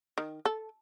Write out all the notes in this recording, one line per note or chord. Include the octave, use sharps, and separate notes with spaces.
D#3
A4